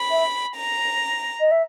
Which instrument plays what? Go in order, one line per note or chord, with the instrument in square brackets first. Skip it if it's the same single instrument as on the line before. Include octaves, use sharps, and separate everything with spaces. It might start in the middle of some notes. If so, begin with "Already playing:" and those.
Already playing: [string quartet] B5
[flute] E5
[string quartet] A#5
[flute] D#5
E5